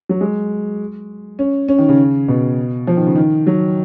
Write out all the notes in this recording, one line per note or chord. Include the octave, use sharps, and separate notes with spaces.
F#3
G#3
C#4
C#4
D#3
C#3
B2
F3
D#3
C#3
D#3
F#3